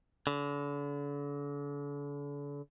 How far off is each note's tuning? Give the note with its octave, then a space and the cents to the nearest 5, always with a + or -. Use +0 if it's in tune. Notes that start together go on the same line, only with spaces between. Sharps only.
D3 -40